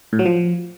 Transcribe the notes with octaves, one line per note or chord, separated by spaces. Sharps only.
A2
F#3
F3